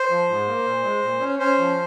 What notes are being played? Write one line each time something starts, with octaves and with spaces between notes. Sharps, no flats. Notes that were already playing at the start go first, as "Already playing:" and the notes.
Already playing: C5
F3
G#2
A#3
A#2
G#3
A#2
C#4
C#4 C5
F3